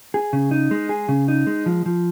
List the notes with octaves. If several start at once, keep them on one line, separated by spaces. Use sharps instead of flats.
G#4
C#3
D#4
G#3
G#4
C#3
D#4
G#3
F3
F3